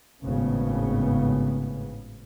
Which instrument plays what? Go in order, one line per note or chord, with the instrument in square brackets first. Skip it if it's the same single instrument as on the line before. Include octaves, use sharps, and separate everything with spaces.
[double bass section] G#1 A2 C#3 B3